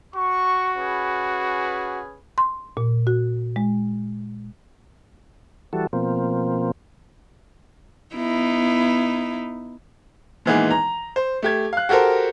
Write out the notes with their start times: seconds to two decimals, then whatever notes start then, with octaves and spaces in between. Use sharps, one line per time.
0.15 F#4 C#6
0.77 C#4 G#4 B4
2.38 C6
2.77 A#2
3.07 F#4
3.56 G#3
5.73 E3 G3 F#4 A4
5.93 B2 F3 A#3 C4
8.15 B3 D#4 E4
10.46 A#2 D#3 E3 G#3 B3 G#4
10.71 A#5
11.16 C5
11.43 A3 G4 G#6
11.73 F5 F#6
11.89 F#4 G4 A4 A#4 C5